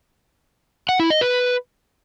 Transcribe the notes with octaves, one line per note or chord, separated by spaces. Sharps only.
F#5
E4
D#5
B4